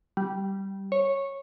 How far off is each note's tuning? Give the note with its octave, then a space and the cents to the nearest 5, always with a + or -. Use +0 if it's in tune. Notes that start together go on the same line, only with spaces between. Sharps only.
G3 -10
C#5 -10